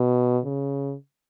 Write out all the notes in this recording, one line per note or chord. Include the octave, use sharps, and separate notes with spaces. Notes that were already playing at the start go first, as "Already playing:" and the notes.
Already playing: B2
C#3